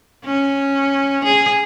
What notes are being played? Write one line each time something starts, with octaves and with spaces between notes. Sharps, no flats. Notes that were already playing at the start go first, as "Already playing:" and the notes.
C#4
G#4